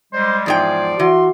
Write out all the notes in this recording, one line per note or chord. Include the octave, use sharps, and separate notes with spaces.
G3 G#3 C5
E2 G#2 F3 F4 G#4 D5 G5
E3 F#4 C6